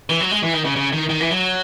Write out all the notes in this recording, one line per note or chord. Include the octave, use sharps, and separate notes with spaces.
E3
F#3
G#3
E3
D#3
C#3
C#3
D#3
D#3
E3
F#3